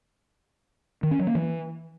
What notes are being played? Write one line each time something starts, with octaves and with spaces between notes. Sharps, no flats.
D#3
C#4
F#3
A#3
E3